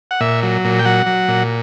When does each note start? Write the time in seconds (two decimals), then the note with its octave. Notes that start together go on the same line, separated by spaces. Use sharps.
0.11 F#5
0.21 A#2 E5
0.43 F#3
0.65 A#2
0.79 G5
0.85 F#3 F#5
1.06 F#3
1.28 A#2